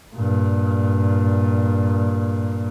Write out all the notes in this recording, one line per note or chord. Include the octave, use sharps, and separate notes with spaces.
G2 A#2